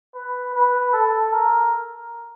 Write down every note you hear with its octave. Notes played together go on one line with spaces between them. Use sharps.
B4
B4
A4
A#4